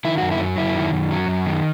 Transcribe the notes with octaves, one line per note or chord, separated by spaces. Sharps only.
D#3 E4
F#2 F#4
E4
F#3
F#2 E4
D#3
F#2
F#3
F#2
D#3